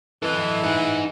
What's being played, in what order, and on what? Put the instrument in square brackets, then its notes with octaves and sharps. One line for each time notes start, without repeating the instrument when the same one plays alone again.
[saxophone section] E3 [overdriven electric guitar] A4 D#5
[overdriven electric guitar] D#4 G#4